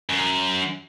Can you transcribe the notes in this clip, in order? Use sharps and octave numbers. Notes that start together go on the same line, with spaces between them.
F#2